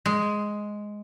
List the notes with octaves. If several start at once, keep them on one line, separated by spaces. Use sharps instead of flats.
G#3